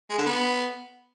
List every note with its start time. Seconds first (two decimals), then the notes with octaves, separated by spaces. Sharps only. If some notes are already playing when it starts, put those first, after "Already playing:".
0.10 G#3
0.18 D3
0.26 B3